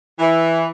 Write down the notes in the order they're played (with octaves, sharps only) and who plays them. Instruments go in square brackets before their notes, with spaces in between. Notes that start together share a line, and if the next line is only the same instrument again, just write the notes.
[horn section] E3